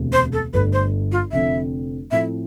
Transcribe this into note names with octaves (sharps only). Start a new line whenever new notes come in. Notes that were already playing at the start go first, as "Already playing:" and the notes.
Already playing: E1 D2 C3
C5
A4
G1 G2 D3 A3 B4
C5
F4
F1 F2 D3 F3 C4 E5
A2 F3 C4 E4 A4 E5